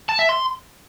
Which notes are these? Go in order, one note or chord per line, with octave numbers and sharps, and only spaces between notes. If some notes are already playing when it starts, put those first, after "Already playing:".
A5
E5
C6